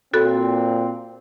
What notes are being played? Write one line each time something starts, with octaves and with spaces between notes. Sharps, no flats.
A#2 C4 F#4 A4 B5